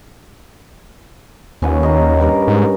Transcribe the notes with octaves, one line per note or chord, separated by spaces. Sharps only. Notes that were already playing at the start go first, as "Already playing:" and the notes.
D#2 C#4 B4 F#5
D#5 A#5
G2 G3 A#4
G#2